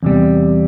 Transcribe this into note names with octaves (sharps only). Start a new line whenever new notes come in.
E2 C3 G3